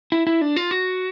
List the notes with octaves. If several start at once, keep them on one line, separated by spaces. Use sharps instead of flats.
E4
E4
D4
F4
F#4